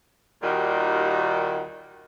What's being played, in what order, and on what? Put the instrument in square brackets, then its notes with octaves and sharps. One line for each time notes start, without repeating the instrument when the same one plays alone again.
[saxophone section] D#2 A#2 D#3 G3 F#4